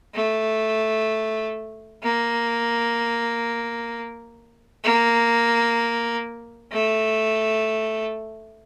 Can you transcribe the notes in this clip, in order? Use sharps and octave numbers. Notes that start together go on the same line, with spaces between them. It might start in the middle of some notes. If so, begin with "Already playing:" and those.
A3
A#3
A#3
A3